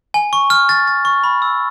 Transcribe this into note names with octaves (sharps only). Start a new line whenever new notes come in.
G#5
C#6
F6
A6
A6
C#6
B5
E6